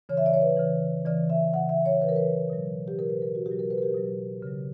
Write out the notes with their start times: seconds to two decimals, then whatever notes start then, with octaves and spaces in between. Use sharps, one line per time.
0.09 C#3 E3 C#5
0.17 E5
0.26 D5
0.33 C#5
0.42 B4
0.57 C#3 E3
1.05 C#3 E3 D5
1.30 E5
1.54 C#3 E3 F#5
1.69 E5
1.86 C#5
2.02 C#3 E3 B4
2.09 A#4
2.16 B4
2.50 B2 F#3
2.88 G4
2.98 B2 F#3 A#4
3.10 B4
3.22 A#4
3.35 F#4
3.46 B2 G4
3.52 F#3
3.59 A#4
3.70 B4
3.78 A#4
3.83 G4
3.94 B2 F#3
4.42 C#3 F#3